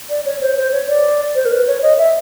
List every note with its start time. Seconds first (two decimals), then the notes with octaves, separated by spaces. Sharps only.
0.10 D5
0.25 C#5
0.41 C5
0.57 C5
0.72 C#5
0.88 D5
1.35 C5
1.45 A#4
1.52 B4
1.67 C#5
1.82 D#5
1.98 E5